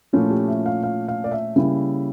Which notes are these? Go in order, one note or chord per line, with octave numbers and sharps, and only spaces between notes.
A#2 F3 A3 C#4 E4 F4
G4
E5
F5
F5
F5
D5
E5
C#3 G3 A#3 C#4 E4